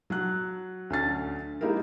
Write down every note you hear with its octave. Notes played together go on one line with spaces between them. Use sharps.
F#3 F#5 F#6
D2 C#4 A6
G#3 A#3 D#4 E4 G4 A#4